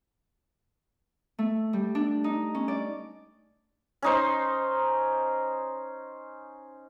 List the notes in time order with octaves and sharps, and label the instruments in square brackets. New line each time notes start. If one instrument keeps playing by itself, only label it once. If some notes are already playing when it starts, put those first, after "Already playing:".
[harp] A3
G3
D4
D#4
C#4
D5
[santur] C#4 D#4 C5